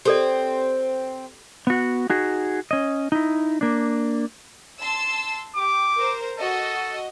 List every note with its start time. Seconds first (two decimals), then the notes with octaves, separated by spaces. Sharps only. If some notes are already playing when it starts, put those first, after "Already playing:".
0.05 C4 G4 A4 D5
1.67 B3 F#4
2.10 D#4 F#4 G#4
2.71 C#4 D#5
3.12 D#4 E4
3.61 A#3 D4
4.81 A5 C6 E6
5.56 G4 D6
5.96 A#4 C5
6.39 F#4 A4 D#5